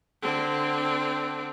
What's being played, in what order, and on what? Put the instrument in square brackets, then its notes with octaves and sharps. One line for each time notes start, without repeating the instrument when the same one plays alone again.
[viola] D3 C4